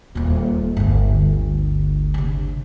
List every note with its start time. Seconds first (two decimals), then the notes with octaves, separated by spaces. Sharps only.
0.15 D#1 A#2
0.77 G1 D2
2.14 C3 D4